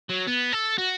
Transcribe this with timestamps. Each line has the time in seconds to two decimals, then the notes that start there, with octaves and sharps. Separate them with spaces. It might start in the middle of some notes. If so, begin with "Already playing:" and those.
0.09 F#3
0.27 B3
0.52 A4
0.78 F#4